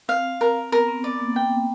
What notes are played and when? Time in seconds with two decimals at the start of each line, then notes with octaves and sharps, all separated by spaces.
0.08 C4 F5
0.41 A#4
0.72 B3 A#4
0.88 C4
1.04 B3 D5
1.20 A#3
1.36 G5